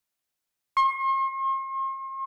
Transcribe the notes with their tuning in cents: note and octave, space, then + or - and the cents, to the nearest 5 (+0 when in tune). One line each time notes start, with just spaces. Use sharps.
C6 +45